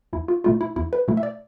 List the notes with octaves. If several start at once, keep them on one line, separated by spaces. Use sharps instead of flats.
E2 E4
F4
B2 A3 E4 F4
E4
E2 E4
B4
B2 A3 E4
E5
D5